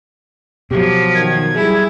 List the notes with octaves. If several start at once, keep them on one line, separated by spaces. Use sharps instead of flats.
B2 F3 F#3 G4
D#3 G#6
G3 E4 G#4